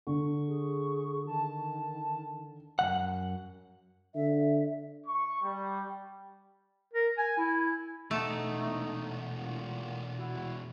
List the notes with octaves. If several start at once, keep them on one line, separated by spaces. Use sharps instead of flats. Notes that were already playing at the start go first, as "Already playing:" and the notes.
D3 C#6
G#4
D#3 A5
F#2 E3 F#5
D3 E5
C#6
G3
A#4
G#5
E4
E2 B2 A3 D#4
A#3 F4 G4
E4 F#4